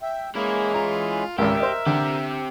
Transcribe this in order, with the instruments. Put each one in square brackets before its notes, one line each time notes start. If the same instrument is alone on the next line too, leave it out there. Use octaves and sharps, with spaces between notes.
[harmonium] E5 G5
[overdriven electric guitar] E3 E4 [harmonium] G#3 C#4 G#4 [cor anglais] A#3
[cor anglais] F4 [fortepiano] A#5
[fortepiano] G#1 C#2 [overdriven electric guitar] G4 [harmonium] A#4 [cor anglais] E5
[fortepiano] C5 D#5
[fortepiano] D3 [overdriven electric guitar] C4 G4